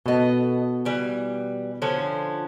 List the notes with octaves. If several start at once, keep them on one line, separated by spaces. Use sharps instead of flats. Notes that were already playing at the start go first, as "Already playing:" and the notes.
B2 B3 A4 D#5
E3 G3
D3 F3 C#4